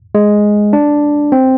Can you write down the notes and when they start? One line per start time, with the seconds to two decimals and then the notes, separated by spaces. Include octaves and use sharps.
0.15 G#3
0.73 D4
1.32 C4